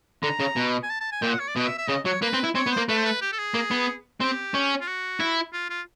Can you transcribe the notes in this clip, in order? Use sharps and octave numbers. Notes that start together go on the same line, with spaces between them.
D3 A#5
C#3
B2
G#5
A5
A5
G#5
A#2 G5
F#5
C#5
D5
B2 D#5
E5
E5
C#3 D#5
F#3 C#5
A#3 B4
C4
E4
C4 C#5
B3
C5
A#3
A3 B4
C5
B4
G4
A4
G#4
A#3
B3
C4 G4
C#4
F4
F#4
E4
F4
F4